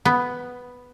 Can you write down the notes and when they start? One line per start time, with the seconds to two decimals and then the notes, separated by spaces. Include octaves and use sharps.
0.05 B3